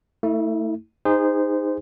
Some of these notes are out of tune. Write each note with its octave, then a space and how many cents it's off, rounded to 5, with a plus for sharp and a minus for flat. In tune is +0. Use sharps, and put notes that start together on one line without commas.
A3 +25 E4 -35
D#4 +0 G#4 -30 C5 -20